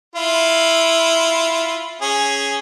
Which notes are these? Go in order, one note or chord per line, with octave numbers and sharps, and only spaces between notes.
E4 F4
C#4 G#4